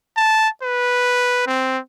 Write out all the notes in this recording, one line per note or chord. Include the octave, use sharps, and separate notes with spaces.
A5
B4
C4